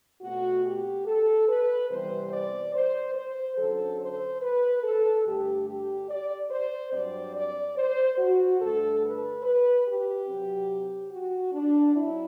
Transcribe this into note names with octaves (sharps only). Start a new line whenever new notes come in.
B2 A3 C4 F#4
G4
A4
B4
C3 E3 G3 B3 C5
D5
C5
C5
F#2 D3 F#3 A4
C5
B4
A4
G2 D3 A3 G4
G4
D5
C5
G2 F#3 C4 D5
D5
C5
F#4
G2 D3 A3 A4
B4
B4
G4
C3 F#3 C4
F#4
D4
F#3 C4 E4